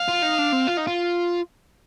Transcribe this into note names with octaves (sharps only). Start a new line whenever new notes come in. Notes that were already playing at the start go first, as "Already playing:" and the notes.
Already playing: F5
F4
D#4
D4
C4
F4
D#4
F4